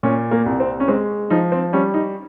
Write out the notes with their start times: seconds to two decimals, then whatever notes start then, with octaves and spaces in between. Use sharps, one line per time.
0.03 A#2 C#4
0.31 A#3
0.46 C2
0.60 C4
0.80 C#4
0.88 G#3 C4
1.30 F3 D#4
1.52 C4
1.73 G3 C#4
1.94 D#4